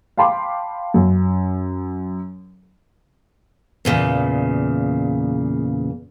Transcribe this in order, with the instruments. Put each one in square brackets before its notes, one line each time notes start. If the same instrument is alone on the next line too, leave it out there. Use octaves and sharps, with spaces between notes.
[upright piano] F5 G5 A5 B5 C6 D6
F#2
[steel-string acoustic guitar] E2 A#2 C#3